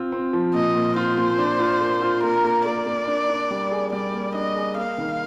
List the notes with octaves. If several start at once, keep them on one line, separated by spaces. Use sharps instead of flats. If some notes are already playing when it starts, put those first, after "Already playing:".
Already playing: C4 F4
C4
F3
A#2 D#5
A#2
F4 C5
A#2
D4
F4
A#3
F4
A#3 A#4
A#3
A#3 D5
A#3
D4
D4
G3
G#4
G3 D5
A#3
D4 D#5
G#4
A#3 F5
D#3